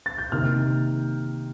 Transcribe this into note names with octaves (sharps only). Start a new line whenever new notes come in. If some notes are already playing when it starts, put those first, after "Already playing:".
A6
G6
C3 D#3 A#3 D#4 F6